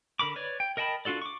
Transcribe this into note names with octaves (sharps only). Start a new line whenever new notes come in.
D3 A#4 B5 D6
B4 C#5 D5
G5
A#4 D#5 G5 A5 B5
D4 F4 F#4 A4 D5
C#6 D6